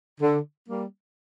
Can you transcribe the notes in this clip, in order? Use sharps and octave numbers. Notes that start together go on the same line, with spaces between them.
D3
G3 A#3